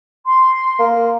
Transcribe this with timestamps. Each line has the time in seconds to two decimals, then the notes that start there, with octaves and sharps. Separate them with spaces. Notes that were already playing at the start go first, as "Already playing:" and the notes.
0.24 C6
0.79 A#3